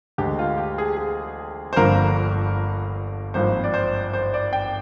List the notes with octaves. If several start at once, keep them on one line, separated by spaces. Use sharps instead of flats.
D2 D3 G#3 G4
F4
G4
G#4
G#4
C5
G1 G2 D3 F3 A#3 A#4
G#1 G2 F3 A#3 C5
D5
C5
C5
D5
G5